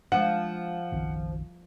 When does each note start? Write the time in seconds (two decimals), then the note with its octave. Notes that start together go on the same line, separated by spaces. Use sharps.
0.12 F3 G#3 A3 D4 F#5
0.92 F#1 B1 D#3